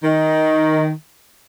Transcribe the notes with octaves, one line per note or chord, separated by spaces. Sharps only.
D#3